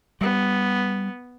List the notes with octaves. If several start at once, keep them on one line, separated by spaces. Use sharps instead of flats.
G3 B3